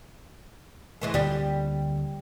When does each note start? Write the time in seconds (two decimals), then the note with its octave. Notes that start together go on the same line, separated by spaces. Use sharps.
1.01 A2 E3 G#3
1.14 D2 D3 G3 A#3 G4